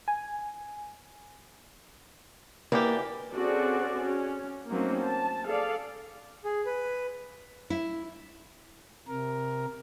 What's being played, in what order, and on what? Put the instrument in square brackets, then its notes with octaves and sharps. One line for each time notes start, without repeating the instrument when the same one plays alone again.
[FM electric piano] G#5
[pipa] B2 E3 G4 [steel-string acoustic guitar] A#3 D4
[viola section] C4 C#4 F#4 G#4 A4 D5
C#4
F#3 A3 A#3 C4 C#4 D#4
A5
G#4 A4 D5 F5
[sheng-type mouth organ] G#4
B4
[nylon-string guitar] E4
[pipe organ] C3 A#4